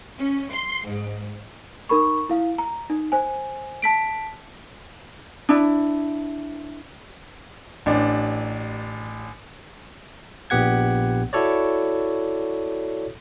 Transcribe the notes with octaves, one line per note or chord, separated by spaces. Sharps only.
C#4
C6
G#2
D#4 A#4 B5 C#6
E4 F5
A#5
D#4
C5 G#5
A5 B6 D7
D4 E4
A1 D4
A#1 A#2 B3 G4 F#5 G#6
E4 F#4 A4 C#5 D5